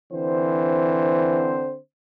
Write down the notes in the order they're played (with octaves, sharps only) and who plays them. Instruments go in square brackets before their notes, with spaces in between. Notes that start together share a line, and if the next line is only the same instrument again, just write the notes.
[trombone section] D3 C4 C5 [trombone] E3